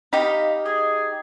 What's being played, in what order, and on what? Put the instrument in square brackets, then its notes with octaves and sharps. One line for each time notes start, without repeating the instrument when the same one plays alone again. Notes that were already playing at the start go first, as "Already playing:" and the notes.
[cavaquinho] D#4 G4 [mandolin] D#5 F5 B5
[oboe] G#4 [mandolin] D#5